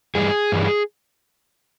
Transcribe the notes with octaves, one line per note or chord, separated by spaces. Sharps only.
G2 E3 G3 G#4
G2 E3 G3